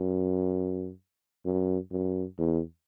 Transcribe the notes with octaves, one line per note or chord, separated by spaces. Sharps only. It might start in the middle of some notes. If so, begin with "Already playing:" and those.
Already playing: F#2
F#2
F#2
E2